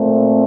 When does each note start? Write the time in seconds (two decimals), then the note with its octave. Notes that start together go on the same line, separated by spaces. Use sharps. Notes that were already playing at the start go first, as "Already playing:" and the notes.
Already playing: A#2 A3 C4